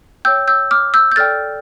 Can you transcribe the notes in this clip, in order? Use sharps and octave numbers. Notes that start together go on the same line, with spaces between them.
C#5 G5 E6 G6
E6 G6
D6 F6
E6 G6
G6
A4 D5 G5 F6 A6